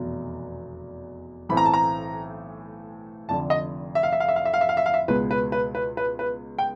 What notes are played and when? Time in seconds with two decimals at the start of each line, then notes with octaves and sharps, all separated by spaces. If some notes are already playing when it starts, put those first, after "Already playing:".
Already playing: F1 E2 B2 F#3
1.49 B1 A2 E3 A3 C4 B5
1.57 A#5
1.65 A5
1.74 A#5
3.29 F1 F2 D3 A5
3.50 D#5
3.95 E5
4.03 F5
4.13 E5
4.20 F5
4.28 E5
4.36 F5
4.45 E5
4.54 F5
4.61 E5
4.69 F5
4.77 E5
4.86 F5
4.94 E5
5.08 C#2 B2 G#3 B3 B4
5.31 B4
5.52 B4
5.75 B4
5.97 B4
6.19 B4
6.58 G5